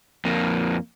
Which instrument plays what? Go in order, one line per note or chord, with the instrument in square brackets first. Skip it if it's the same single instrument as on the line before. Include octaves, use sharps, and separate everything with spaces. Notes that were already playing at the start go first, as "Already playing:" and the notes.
[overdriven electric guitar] F2 A#3